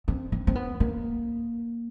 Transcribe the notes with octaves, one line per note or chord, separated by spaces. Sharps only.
C4
C4
C4
B3
A#3